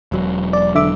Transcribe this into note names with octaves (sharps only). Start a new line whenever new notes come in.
E1 F#3
D5
D3 E5 D6